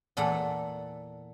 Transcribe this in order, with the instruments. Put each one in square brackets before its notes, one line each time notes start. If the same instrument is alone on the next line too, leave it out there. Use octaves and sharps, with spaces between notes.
[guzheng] E2 A#2 A4 F#5